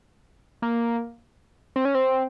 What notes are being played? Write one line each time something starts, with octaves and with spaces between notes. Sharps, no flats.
A#3
C4
C#4
C4